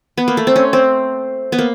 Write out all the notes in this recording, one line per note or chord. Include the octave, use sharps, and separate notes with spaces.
B3
A#3
A3
C4
C#4
C4
B3
A#3